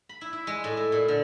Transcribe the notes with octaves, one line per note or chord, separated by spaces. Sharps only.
B5
E4
E4
G#3
A2
E4
A#2
D3